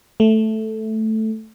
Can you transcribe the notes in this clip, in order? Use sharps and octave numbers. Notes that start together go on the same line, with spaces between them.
A3